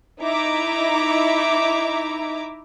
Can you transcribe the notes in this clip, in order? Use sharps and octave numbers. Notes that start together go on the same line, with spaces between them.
D#4 E4 E5 A#5 D6